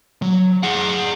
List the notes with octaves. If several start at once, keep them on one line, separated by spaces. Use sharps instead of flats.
F#3
G#4 F#5